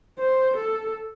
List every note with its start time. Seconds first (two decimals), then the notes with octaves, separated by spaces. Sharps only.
0.18 C5
0.56 A4